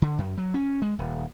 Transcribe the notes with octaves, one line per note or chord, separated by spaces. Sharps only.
D3
F#2
F#3
C#4
G#3
D#1